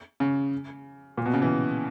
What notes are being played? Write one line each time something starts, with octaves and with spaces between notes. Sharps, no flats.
C#3
A#2
B2
C#3
E3